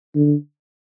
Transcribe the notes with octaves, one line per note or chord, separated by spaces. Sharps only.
D3